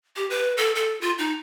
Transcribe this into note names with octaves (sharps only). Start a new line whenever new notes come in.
G4
B4
A4
A4
F4
D#4